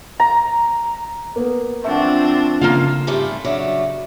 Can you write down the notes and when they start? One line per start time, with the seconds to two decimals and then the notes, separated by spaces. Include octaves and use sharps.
0.20 A#5
1.36 A#3 B3
1.84 F3 A3 C4 D4 E5 F#5
2.61 C#3 A#3 F4 F5
3.07 G#2 C3 G3 A3 E4 F4
3.44 C#3 F#3 A3 D4